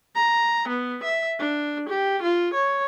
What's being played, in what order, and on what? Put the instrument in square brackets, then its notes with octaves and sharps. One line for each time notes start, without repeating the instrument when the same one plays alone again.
[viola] A#5
B3
E5
D4
G4
F4
C#5